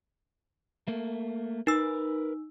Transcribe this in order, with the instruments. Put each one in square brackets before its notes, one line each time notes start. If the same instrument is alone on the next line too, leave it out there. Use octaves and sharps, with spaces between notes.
[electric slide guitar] A3 A#3
[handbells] D#4 E6 [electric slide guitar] A#4 B4